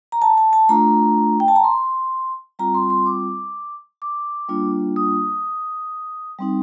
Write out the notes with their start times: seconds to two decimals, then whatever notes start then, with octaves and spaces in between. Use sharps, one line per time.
0.12 A#5
0.22 A5
0.38 A5
0.53 A5
0.69 A3 D4 F4 A#5
1.40 G5
1.48 A5
1.56 A#5
1.64 C6
2.59 G3 C4 F4 A#5
2.74 C6
2.90 C6
3.06 D6
4.02 D6
4.49 G3 A#3 D4 F4
4.96 D#6
6.39 G3 C4 D#4